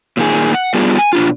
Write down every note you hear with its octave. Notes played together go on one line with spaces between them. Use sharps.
A#2 D#3 G#4
F#5
G3 B3 D4 F4 G#4
G#5
B2 D4 F4